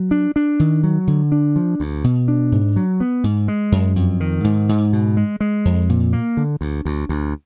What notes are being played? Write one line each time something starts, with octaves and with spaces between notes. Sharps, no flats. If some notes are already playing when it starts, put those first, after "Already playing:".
Already playing: F#3
D4
D4
D#3
F#3
D3
D4
F3
D2
B2
D4
G#2
F#3
B3
G#2
G#3
F#2
F2
D#3
G#2
G#2
B2
G#3
G#3
F2
A#2
A#3
D3
D2
D2
D2